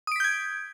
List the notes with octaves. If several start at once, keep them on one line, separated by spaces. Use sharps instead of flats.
D#6 G6 G#6 B6 D7